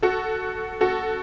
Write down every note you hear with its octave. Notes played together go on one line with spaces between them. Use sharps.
F#4 A4
F#4 A4